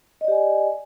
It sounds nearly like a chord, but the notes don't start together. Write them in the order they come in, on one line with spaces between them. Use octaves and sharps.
D#5 D5 G4 G#5